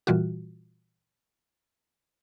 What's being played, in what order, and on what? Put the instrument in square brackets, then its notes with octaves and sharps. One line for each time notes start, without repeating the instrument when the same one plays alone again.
[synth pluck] A#2 E3 G3 F4 F#4